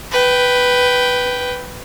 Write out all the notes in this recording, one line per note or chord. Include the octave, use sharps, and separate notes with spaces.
B4 G5